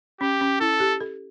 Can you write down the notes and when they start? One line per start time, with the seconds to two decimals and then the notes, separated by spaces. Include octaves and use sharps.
0.21 C#4 G4
0.41 C#4
0.60 E4 A4
0.80 G4
1.00 A4